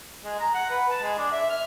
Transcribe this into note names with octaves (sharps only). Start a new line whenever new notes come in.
G#3
A#5
F#5
B4
A5
G#3
D4
E5
F6